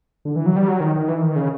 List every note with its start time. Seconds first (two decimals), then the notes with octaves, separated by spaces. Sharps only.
0.25 D3
0.36 E3
0.46 F#3
0.56 G3
0.68 F#3
0.81 D#3
0.95 D#3
1.08 E3
1.22 D#3
1.36 C#3